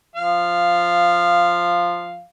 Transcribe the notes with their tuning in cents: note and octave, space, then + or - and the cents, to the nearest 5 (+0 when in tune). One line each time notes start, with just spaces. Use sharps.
F3 +0 F5 -5